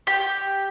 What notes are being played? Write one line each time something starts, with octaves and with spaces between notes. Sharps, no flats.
G4